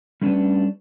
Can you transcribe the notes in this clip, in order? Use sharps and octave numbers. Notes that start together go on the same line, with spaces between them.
G3 A3 C#4 D4 G4 B4